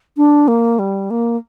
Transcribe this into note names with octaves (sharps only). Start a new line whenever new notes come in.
D4
A#3
G3
A#3